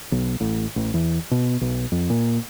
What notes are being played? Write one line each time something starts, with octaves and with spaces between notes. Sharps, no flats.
B1
A1
A1
E2
B2
B1
F2
A#2